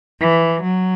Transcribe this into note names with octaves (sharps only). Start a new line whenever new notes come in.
E3
F#3